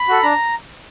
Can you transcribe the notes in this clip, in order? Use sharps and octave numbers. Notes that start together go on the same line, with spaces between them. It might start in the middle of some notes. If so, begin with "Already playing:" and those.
Already playing: B5
F#4 A4
D4 A#5